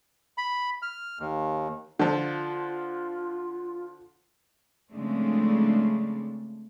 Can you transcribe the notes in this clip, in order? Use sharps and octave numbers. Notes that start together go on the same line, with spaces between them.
B5
F6
D#2
D3 F3 F4
C#3 F3 G#3 A3 C4 D4